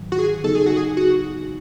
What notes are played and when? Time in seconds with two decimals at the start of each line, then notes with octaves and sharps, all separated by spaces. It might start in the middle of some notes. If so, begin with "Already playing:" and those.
Already playing: G#2 D#3 F#3
0.12 F#4
0.19 G#4
0.44 C#3 F#3 B3 D#4 A4
0.55 G#4
0.66 F#4
0.77 G#4
0.97 F#4